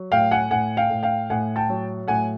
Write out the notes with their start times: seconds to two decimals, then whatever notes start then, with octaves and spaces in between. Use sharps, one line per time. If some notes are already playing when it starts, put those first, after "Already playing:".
Already playing: F#3
0.12 A2 F5 G5
0.31 F#5 G#5
0.51 A2 F#5 G#5
0.77 F5 G5
0.90 A2
1.03 F5 G5
1.30 A2 F#5 G#5
1.56 G5 A5
1.69 F#3
2.08 A2 F#5 G#5